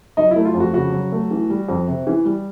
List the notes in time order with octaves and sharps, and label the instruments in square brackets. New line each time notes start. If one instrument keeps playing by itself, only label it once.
[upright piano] F#3 [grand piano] D#4
[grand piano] E4
[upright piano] A3
[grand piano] F4
[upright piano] F2
[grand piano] F#4
[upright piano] C#3 [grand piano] F#4
[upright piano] F#3
A3
E3
G3
F2
C3
E3
G3